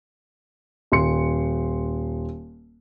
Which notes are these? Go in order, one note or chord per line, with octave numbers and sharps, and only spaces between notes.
D#1 C6 C#7